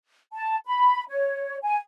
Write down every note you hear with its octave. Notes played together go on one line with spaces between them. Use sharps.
A5
B5
C#5
G#5